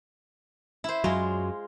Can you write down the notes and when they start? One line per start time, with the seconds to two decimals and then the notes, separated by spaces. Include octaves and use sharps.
0.84 E4 C5
1.04 F#2 F#3 G#3 F4